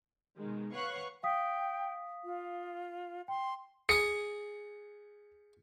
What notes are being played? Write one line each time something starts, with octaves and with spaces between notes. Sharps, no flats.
B2 D#3 G#3
B4 C#5 F5 F#5 C#6 F#6
F5 G5 D#6 B6
F4
G5 C6
G#4 D#6 C#7